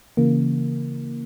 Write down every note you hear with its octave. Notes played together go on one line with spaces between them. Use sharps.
C#3 E3 A#3